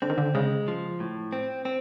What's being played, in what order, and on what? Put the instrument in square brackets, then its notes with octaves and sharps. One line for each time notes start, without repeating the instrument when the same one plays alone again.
[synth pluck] D3 [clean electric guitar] C4
[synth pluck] D#3
D3
[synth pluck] C#3 [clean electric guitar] G#3
[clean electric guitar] F3
A2
C4
C4